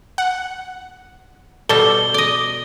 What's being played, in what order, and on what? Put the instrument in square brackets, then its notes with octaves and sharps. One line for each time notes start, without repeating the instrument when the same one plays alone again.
[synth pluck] F#5
[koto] B2 G3 [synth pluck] A4 [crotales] G7
[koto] D5 D#5